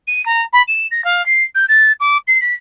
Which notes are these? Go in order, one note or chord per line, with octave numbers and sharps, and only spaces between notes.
D#7
A#5
B5
E7
A#6
F5
C7
G6
A6
D6
C7
B6